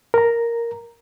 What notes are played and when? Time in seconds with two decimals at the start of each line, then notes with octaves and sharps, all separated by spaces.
0.14 A#4 A#5